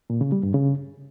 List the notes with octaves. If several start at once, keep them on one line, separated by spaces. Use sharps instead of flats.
A#2
C#3
G3
G2
C#3